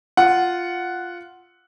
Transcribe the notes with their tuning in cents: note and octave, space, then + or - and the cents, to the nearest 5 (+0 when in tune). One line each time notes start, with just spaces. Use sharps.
F4 +0 F#5 +0